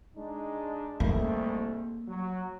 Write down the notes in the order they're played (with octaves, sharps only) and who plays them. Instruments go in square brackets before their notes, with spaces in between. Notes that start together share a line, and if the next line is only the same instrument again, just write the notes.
[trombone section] G#3 D4 D#4
[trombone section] C2 G#2 A3 [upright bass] A#3
[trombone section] F#3